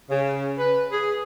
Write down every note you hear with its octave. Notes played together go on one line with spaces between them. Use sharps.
C#3
B4
G#4